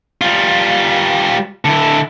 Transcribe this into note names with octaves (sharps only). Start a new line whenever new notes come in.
G3 F4
D3 E4